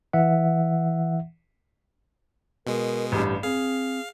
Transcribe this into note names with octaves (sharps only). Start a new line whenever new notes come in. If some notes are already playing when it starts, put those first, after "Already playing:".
E3 E5 F#5
B2 G#3 A#4
A1 G2 G4
C4 G#4 F5